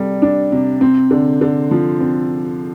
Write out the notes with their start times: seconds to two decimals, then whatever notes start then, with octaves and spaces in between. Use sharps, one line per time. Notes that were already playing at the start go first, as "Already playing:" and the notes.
Already playing: C3 G3 A4
0.22 D4
0.52 C3
0.81 C4
1.11 D3
1.41 D3
1.71 F3
2.00 C4